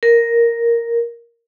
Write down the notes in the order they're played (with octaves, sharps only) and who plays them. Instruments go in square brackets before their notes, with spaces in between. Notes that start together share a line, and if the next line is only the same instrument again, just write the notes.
[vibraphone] A#4